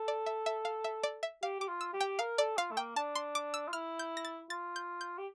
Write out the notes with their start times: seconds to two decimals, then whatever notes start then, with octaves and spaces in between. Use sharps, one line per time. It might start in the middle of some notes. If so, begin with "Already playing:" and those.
Already playing: A4
0.08 D5
0.26 E5
0.46 E5
0.65 F5
0.84 E5
1.03 D5
1.23 E5
1.42 G4 F5
1.60 G4 D6
1.68 F4
1.81 E6
1.93 G4
2.00 G5
2.19 A#4 F5
2.38 A4 D5
2.58 F4 F5
2.71 A3
2.77 A#3 G5
2.96 D4 A5
3.15 C6
3.35 D6
3.54 E6
3.68 F4
3.73 E4 F6
3.99 G6
4.17 A#6
4.25 A6
4.50 F4 A6
4.76 G6
5.01 G6
5.18 G4